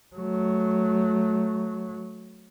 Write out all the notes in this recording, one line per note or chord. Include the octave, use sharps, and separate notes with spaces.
F#3 A3